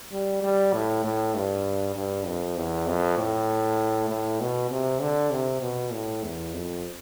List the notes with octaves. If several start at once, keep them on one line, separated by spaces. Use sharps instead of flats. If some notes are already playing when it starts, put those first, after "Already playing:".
G3
G3
A2
A2
G2
G2
F2
E2
F2
A2
A2
B2
C3
D3
C3
B2
A2
E2
F2